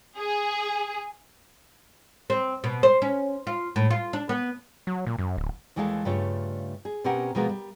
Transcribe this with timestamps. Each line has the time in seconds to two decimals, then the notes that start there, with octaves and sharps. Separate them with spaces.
0.16 G#4
2.30 C4
2.64 B2
2.83 C5
3.02 C#4
3.47 F4
3.76 A2
3.91 F4
4.13 D4
4.29 B3
4.87 F#3
5.07 A#2
5.19 F#2
5.37 D1
5.76 D#2 E3 G#3 A3 A4 F5
6.05 G2 C#3 A3 F4 C#5
6.85 G#4
7.04 B2 C4 C#4 G4 A#4 F#5
7.35 B2 F3 G#3 A#3 B3 A#4
7.49 G3